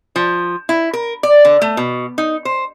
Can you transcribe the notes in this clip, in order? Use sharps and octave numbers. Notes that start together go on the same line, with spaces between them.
F3
E4
A#4
D5
D3
A3
B2
D#4
C5